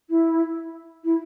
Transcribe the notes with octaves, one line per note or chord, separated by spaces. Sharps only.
E4
E4